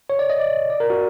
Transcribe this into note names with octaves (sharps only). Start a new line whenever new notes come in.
C#5
D5
D#5
D5
D5
A#4
F#4